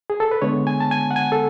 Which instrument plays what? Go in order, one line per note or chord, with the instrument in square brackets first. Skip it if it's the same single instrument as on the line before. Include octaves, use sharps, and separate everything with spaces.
[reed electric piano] G#4
A4
B4
D3 G#3 B3 C#5
G#5
A5
G#5
F#5
G#5
A4